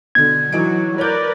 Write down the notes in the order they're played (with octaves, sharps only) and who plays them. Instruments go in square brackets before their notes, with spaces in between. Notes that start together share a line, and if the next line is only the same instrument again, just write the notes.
[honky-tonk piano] B2 D3 [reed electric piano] G#6
[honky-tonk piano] E3 D#4 D7 [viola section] F#3
[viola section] A#4 B4 D5 [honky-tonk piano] C#5 G6